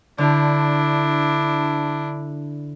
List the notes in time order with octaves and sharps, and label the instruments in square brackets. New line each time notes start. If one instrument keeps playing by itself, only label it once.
[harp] D3 [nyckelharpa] D4 E4